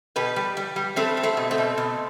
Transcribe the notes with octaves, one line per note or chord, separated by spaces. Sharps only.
B2 G4 B4
G3
G3
G3
G3 A3 C4
G3
A3 C4
B2
A3 C4
B2
B2